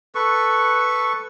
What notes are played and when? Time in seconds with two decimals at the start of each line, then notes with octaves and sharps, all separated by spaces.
0.15 A4 B4 C#6